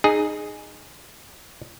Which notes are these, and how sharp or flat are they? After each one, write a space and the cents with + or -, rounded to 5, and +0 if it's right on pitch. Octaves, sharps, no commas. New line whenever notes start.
D#4 -20 G#4 +0